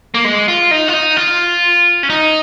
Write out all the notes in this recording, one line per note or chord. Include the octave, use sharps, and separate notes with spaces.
A#3
G#3
F4
D#4
F4
D#4
F4
C#4
D#4